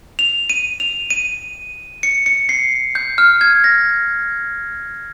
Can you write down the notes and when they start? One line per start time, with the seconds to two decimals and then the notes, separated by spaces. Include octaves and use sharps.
0.19 F7
0.50 D#7
0.80 F7
1.10 D#7
2.03 C#7
2.26 C#7
2.49 C7
2.95 G6
3.18 F6
3.41 G#6
3.64 A#6